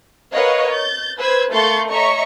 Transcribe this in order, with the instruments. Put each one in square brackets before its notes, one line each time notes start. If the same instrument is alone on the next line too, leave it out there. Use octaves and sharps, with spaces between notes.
[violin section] A#4 B4 C#5 D#5 F5 F#5
G6 A6
B4 C5 E6 G#6
A3 A#3 C6 C#6 G6 A6
C#5 D#5 E5 A#5 C#6